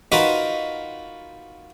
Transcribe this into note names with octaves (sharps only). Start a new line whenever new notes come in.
D#4 F4 F#4 A#4 B4 D#5